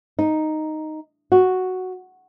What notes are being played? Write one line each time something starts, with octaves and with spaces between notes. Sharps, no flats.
D#4
F#4